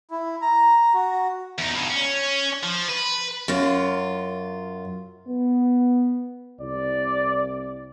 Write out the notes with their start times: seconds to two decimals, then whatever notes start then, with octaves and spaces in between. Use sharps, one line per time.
0.11 E4
0.42 A#5
0.94 F#4
1.58 E2 D#4
1.75 G2 B2
1.89 C#4
2.63 F3
2.89 B4
3.48 F#2 F4
5.27 B3
6.61 C2 D5